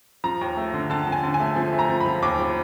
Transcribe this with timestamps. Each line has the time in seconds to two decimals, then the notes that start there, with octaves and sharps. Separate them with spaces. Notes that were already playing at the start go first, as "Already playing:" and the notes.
0.24 F3 A#5
0.41 D#2
0.57 A3
0.73 D3
0.90 D3 A5
1.07 F3
1.12 G#5
1.23 D3
1.34 G#5
1.40 A3
1.56 F3
1.73 A3
1.79 A#5
1.89 F3
2.00 B5
2.06 F3
2.22 D#2 D6
2.39 F3